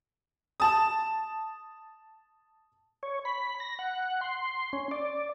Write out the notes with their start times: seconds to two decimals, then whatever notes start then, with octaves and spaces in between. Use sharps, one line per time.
0.60 A5 D#6
3.03 C#5
3.25 B5
3.60 A#6
3.79 F#5
4.21 C6
4.73 C#4
4.91 D5